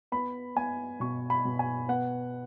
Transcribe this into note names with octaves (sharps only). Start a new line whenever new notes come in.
B3 B5
B3 G#5
B2 C#6
B5
B2
G#5
B3 F#5